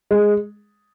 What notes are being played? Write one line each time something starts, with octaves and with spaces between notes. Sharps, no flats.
G#3